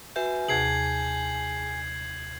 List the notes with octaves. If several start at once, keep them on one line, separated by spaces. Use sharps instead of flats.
F#4 B4 E5 G#5 G6
D#2 C3 G#4 A5 G#6 C7 F#7